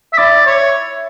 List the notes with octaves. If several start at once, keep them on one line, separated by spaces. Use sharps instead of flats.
E5
E4 D5
C#5